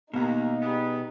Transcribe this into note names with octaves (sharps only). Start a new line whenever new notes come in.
D#2 B2 A#3 D#4
G3 B3 G#4